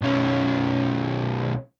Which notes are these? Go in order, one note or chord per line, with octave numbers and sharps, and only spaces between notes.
B1 C#4